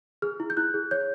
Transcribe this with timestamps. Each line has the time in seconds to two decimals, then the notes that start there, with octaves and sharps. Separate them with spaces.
0.22 G#4 F6
0.40 E4
0.50 G6
0.57 E4 F#6
0.74 G#4
0.91 C#5 G6